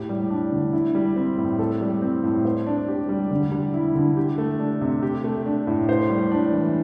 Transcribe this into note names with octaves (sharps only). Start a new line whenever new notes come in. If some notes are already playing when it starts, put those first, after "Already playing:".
Already playing: A2 G4
G3
D4
D3
E4
G3
C4
A2
A4
G3
C4
A2
C5
D4
G4
G3
D3
G3
E4
D3
G4
A3
D4
C3
G4
A3
D4
A2
C5
G3
D4
E3